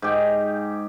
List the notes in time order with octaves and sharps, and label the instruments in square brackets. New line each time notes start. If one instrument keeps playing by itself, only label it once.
[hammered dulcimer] G#2 G4